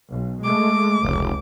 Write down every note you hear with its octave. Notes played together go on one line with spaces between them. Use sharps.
B1
G#3 A3 D6
F1 C#2